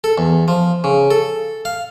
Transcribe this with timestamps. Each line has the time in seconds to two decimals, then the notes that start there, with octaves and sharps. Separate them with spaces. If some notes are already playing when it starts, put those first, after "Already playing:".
0.04 A4
0.18 E2
0.48 F3
0.84 C#3
1.11 A4
1.65 F5